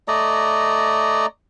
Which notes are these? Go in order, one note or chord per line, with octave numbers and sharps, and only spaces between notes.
A3 D5 D#5 A#5